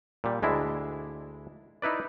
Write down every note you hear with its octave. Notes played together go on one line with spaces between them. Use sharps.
A#2 G3
D2 G#3 D4 E4
D#4 E4 B4 D5